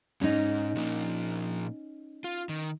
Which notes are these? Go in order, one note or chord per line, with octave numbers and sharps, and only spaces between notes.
G#2 C#4 D#4
A#2 F3 A#3
F4
D#3